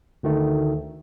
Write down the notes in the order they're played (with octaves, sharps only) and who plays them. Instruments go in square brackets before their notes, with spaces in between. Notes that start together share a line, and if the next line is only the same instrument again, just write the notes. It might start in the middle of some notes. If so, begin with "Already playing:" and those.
[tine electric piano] D2 D#3 A3